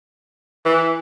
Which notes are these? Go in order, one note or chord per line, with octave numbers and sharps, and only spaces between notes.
E3